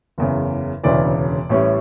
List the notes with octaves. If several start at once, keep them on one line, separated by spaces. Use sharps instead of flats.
F#1 E2 C#3
E1 D2 C#3 E3 D5
A1 A2 G3 C#4